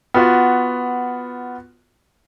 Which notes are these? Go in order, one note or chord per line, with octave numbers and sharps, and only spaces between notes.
B3 F4 F#4